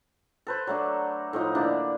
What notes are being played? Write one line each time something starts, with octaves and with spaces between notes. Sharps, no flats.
A4 B4 C5
F#3 A3 D4
A2 F3 D#4
D3 A#3 D4 E4